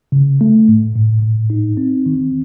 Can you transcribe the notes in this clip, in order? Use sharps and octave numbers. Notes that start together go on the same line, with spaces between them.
C#3
A3
A2
A2
A2
D#4
C4
D#3